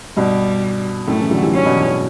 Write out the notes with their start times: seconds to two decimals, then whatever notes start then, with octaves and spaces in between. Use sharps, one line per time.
0.17 G2 B2 G3
1.08 F#2 A2 A3
1.20 C#3 E3
1.31 D3 F#3
1.42 E3 G3
1.54 D3 F#3 C#4
1.65 G2 B2
1.76 E2